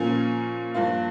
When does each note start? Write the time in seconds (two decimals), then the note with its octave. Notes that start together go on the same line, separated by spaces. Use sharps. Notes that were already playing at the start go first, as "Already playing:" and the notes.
Already playing: A#2 F3 A#3 C#4
0.74 G2 F3 A#3 F4